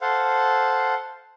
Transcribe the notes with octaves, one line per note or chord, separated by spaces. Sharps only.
A4 C5 F5 F#5